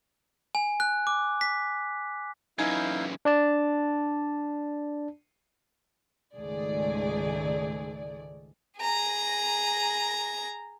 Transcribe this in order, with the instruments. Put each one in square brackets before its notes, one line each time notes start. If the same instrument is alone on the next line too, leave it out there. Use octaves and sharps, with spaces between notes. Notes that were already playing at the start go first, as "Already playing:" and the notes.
[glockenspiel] G#5
F#6
D6
B6
[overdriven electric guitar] F#2 E3 [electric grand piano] D#4 G#5 G#6 [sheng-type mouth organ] E4 F5 G6
[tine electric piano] D4 D5 A5
[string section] C#2 G#2 D#3 A3 G#4 D5
[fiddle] G#4 A#5